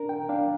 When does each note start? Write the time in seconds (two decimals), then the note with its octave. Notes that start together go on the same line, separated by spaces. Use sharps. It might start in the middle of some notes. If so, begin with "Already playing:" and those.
Already playing: D4 A#4
0.09 G5
0.29 D4 F5